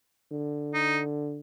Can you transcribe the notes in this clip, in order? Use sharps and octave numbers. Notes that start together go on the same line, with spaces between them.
D3
D#4